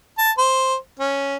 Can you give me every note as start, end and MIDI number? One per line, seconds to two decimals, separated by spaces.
0.18 0.32 81
0.38 0.75 72
1.00 1.36 61